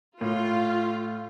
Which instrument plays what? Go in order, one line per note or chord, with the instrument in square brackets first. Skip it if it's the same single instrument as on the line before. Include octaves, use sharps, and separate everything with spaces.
[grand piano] A2 [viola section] F4